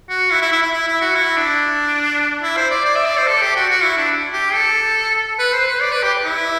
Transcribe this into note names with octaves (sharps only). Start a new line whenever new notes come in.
F#4
E4
E4
E4
E4
E4
E4
F#4
E4
D4
E4
C5
D5
D5
E5
D5
C5
A4
G4
F#4
F#4
E4
D4
G4
A4
B4
C5
B4
D5
B4
G4
E4